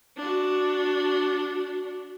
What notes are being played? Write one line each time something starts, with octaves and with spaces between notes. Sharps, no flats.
D4 F#4